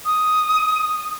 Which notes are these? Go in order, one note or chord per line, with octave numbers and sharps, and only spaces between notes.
D#6